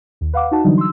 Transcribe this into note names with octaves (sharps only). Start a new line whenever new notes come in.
D#2
B4 F5 F#5 D6
D#4 F#4 A5
D3 E3 F#3 G3 D4 D#4
C6 E6